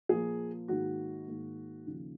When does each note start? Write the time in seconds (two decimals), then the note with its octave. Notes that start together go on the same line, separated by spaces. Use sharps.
0.09 A#2 F3 A#3 G#4
0.68 G#2 D#3 A#3 F#4
1.27 G#2 D#3 A#3
1.86 D#2 C#3 F3